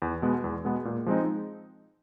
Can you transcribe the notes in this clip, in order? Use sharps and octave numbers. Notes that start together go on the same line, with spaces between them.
E2
B2 G#3 B3
E2
B2 G#3 B3
A#2
F3 G#3 C4 D#4